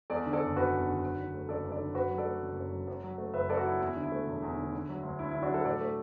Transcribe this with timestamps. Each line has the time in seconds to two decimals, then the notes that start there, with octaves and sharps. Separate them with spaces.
0.10 E2 A4 D5
0.26 D3
0.33 A4 D5
0.42 F#1
0.56 F#1 F#4 B4
0.72 E2
0.87 D3
1.02 F#2
1.18 D3
1.34 A3
1.49 F#1 A4 D5
1.65 F#2
1.72 A4 D5
1.80 D3
1.95 F#2 F#4 B4
2.10 F#3
2.18 A4 D5
2.27 A3
2.42 F#1
2.56 F#2
2.72 F#3
2.87 F#2
3.03 F#3
3.18 A3
3.34 F#1 B4 E5
3.49 F#2 A4 D5
3.57 F#4
3.65 F#3 E4
3.80 E2 E4
3.96 D3
4.03 E4
4.12 A3
4.27 E1
4.42 E2
4.57 D3
4.72 D3
4.89 F#3
5.03 D2
5.19 D2 E4
5.31 D3 E4
5.42 D4 F#4
5.50 F#3 E4 A4
5.65 A2 A4 D5
5.81 A3